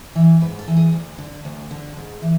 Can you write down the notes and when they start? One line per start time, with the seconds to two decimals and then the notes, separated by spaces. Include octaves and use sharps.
0.15 E3
0.41 G#2 B4
0.59 A4
0.68 E3
0.76 G#4
0.93 D2
1.18 D3
1.45 D2
1.71 D3
1.97 G#2
2.22 E3